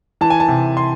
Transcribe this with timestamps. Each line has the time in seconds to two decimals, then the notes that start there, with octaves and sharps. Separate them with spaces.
0.21 E3 A5
0.30 G#5
0.40 A5
0.48 C3
0.77 C6